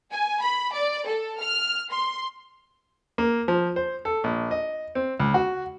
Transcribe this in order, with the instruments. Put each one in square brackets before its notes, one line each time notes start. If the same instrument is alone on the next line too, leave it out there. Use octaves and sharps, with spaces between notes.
[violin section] G#5
B5
D5
A4
F6
C6
[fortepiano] A#3
F3
C5
A4
A#1
D#5
C4
C#2
F#4